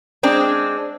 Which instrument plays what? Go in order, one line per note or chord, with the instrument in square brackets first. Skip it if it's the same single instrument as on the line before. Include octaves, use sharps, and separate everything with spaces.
[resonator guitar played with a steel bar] G#3 C4 D4